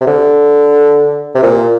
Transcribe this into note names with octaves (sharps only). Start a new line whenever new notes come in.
C3
D3
C3
A#2